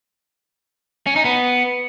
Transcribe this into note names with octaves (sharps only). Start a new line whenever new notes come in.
C#4
D#4
B3